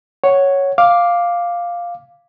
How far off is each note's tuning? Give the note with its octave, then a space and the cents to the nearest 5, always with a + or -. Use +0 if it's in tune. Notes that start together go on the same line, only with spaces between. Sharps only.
C#5 +0 F#5 +0
F5 +0 D6 +0